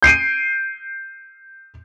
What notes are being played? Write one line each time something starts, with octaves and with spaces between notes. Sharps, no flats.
G6 C7 D7 D#7